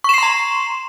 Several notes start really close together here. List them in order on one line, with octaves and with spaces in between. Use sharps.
C#6 E7 C7 C6 A#5